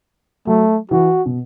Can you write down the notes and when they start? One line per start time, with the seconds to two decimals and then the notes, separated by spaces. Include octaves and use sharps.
0.47 F#3 A3
0.91 E3 F#4
1.26 B2